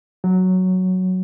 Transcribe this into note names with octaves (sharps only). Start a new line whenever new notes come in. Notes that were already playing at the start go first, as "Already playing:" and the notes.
F#3